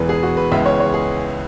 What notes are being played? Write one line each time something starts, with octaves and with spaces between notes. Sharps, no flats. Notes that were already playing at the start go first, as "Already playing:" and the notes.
Already playing: E1 E2 E3 G#3 B3 B4
G#4
F#4
B4
C#2 C#3 E3 G#3 B3 E5
C#5
C#5
G#4